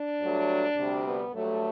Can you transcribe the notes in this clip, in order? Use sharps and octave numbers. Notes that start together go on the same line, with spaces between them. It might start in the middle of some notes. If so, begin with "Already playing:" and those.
Already playing: D4
G2 F#3 A3
D2 C3 G3
B3
G2 F#3 A3